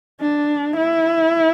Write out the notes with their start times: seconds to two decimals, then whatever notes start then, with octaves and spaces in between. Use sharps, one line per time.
0.21 D4
0.77 E4